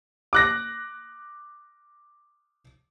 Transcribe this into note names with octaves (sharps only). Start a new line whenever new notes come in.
D6 F#6 A#6